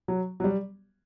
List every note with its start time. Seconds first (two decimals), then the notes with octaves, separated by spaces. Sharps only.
0.08 F#3
0.40 F#3
0.44 G3